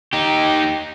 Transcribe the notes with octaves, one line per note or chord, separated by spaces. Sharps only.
D#4 G4